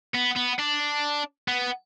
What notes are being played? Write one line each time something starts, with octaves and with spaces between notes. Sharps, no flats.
B3
B3
D4
B3